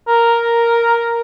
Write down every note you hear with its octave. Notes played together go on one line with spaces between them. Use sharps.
A#4